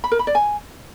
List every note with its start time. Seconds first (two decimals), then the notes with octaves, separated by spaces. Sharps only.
0.04 B5
0.12 A#4
0.19 B5
0.27 D5
0.35 G#5